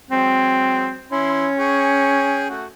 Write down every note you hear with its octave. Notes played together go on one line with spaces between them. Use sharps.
F#3 G#3 C4 G5
E3 C#4 E4 C6
G#4 G5 C#6
A3 F#4